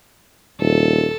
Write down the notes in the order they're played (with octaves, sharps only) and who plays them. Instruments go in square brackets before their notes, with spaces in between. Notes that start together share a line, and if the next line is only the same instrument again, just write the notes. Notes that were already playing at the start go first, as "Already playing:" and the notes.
[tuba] D#1 [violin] A4